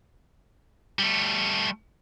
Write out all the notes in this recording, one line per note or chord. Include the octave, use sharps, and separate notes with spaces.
G3 A3